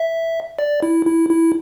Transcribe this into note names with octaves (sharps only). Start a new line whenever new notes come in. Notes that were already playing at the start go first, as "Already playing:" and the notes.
Already playing: E5
D5
E4
E4
E4